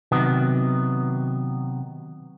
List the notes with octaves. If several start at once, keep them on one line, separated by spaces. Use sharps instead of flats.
C3 D#3 F#3 B3